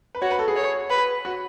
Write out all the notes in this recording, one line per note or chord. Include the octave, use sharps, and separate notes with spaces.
B4
F#4 C#5
B4
A4
G#4
C#5
B4
F#4